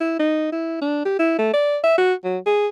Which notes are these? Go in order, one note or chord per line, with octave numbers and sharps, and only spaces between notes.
E4
D#4
E4
D4
G4
E4
A3
D5
E5
F#4
F#3
G#4